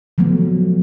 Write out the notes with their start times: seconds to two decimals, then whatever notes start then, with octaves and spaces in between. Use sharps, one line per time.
0.18 F3 F#3 A3 B3